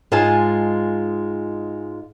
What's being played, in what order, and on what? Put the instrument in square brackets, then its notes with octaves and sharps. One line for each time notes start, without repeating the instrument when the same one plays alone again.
[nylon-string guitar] G#2 G#3 F4 F5 G#5 A5